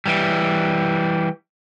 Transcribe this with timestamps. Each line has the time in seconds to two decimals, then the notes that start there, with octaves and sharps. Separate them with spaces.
0.06 E3 G3